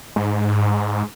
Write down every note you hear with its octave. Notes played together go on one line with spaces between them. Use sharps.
G#2